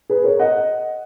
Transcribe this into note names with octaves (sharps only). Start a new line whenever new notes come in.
G#4 B4
A#4 C#5
D#5 F#5